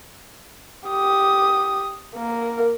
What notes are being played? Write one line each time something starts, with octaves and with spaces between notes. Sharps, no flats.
G4 D#6
A#3 A#4